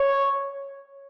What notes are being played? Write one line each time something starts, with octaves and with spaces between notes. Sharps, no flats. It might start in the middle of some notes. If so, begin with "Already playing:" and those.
Already playing: C#5